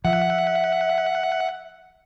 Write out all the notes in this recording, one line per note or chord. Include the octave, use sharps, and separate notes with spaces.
F3 E5 F#5